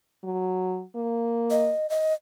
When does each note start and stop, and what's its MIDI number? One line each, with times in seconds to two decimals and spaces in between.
0.24 0.82 54
0.95 1.71 58
1.51 1.89 75
1.90 2.14 75